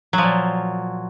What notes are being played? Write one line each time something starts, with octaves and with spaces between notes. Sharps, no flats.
A#2 F3 F#3